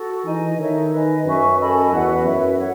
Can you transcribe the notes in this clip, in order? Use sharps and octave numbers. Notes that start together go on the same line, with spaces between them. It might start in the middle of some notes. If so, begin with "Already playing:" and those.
Already playing: F#4 A4
E3 D#4 G#4 D#5 G#5
D#3 D#4 A4 C#5 E5
B4 D#5 G#5
F#2 B4 E5 G#5 C#6
A4 D#5 G#5 B5
E2 F#4 B4 F#5
F#2 E4 B4 E5
A4 C#5 F#5